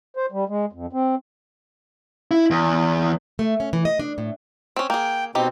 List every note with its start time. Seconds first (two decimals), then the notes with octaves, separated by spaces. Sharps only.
0.17 C5
0.32 G3
0.49 G#3
0.72 F2
0.93 C4
2.31 E4
2.50 E2
3.39 A3
3.60 C#4
3.73 E3
3.85 D#5
3.99 D4
4.18 A2
4.76 C4 C#4
4.90 A#3 G#4 G5
5.35 B2 C4 D#4 G4